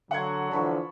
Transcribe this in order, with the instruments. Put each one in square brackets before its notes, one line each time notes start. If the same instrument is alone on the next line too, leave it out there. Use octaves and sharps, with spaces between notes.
[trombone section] D3 [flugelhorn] F#3 [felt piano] F#5 C6 G#6
[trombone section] D3 E3 F3 [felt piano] A5 B5 C#6